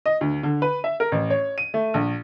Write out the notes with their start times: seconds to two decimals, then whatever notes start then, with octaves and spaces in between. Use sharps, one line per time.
0.06 D#5
0.21 D2
0.43 D3
0.62 B4
0.84 E5
1.00 A#4
1.12 A1
1.30 C#5
1.58 D#7
1.74 A3
1.94 A#1